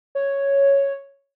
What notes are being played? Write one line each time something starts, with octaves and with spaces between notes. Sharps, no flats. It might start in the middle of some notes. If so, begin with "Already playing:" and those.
C#5